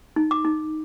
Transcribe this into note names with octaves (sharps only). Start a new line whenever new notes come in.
D#4
D6
D#4